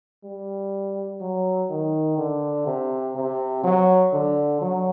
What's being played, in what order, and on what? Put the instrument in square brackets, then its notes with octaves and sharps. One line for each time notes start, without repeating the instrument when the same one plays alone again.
[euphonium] G3
F#3
D#3
D3
C3
C3
F#3
D3
F#3